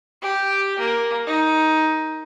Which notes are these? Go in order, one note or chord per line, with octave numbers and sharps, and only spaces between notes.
G4
A#3
D#4